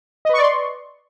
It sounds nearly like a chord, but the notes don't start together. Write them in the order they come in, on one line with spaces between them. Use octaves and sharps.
D#5 B4 C#6 D5 C6